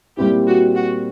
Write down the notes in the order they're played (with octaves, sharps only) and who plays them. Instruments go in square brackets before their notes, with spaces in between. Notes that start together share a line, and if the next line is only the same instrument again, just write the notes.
[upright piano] A#2 G3 C4 E4 [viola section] G4
[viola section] F#4
F#4